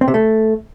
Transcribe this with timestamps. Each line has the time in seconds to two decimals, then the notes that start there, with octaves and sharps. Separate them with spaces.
0.01 C4
0.08 C3
0.14 A3